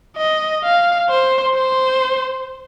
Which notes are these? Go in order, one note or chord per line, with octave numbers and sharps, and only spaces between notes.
D#5
F5
C5
C5